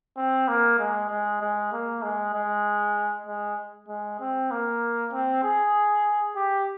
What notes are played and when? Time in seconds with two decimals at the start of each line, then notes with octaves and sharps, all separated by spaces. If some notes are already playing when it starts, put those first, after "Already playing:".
0.17 C4
0.48 A#3
0.79 G#3
1.10 G#3
1.41 G#3
1.72 A#3
2.03 G#3
2.34 G#3
3.27 G#3
3.88 G#3
4.20 C4
4.51 A#3
5.13 C4
5.44 G#4
6.36 G4